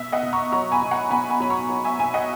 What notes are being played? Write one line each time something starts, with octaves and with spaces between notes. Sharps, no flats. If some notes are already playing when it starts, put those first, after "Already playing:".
Already playing: B2 E5
D#5 F#5
B2
A#5 C#6
F#3 A#5 C#6
G#5 B5
B2
F#5 A#5
B2 G#5 B5
G#5 B5
F#3 B5
A#5 C#6
F#3
E5 G#5
B2 E5 G#5
D#5 F#5